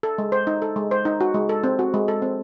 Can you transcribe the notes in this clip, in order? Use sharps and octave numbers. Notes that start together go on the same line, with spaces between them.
A4
G#3
C5
D#4
A4
G#3
C5
D#4
F#4
G#3
A4
C4
F#4
G#3
A4
C4